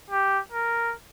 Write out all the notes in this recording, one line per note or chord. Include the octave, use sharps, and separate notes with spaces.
G4
A#4